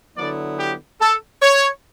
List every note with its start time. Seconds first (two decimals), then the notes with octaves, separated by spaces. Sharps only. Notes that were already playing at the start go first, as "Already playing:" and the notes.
0.15 D3 F#3 B3 E4 D5
0.58 G4
1.01 A4
1.42 C#5